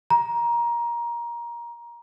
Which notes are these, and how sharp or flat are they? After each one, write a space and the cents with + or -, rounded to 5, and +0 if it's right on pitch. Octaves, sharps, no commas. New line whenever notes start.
A#5 +20